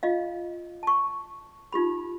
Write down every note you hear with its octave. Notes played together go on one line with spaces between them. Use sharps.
F4 D#5 F5
A5 C#6
D#4 F4 G4 B5